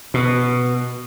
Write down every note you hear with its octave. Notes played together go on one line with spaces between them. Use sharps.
B2